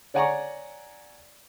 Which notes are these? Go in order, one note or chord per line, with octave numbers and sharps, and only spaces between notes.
C#5 D5 F#5 G#5 A#5 C#6